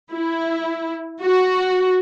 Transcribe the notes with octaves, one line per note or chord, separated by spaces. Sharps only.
E4
F#4